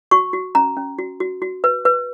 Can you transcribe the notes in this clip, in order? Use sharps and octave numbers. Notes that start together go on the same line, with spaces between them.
F#4 C#6
F#4
C#4 A#5
C#4
F#4
F#4
F#4
B4
B4